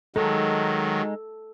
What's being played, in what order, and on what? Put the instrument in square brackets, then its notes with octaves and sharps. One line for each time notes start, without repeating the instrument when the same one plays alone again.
[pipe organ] D#3 F#3 [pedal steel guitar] G#3 D#4 [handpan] A4